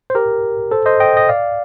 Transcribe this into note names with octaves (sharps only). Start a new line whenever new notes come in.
C5
G4 A#4
A4 C5
C5 D#5
D#5 G5
D#5
D5 F5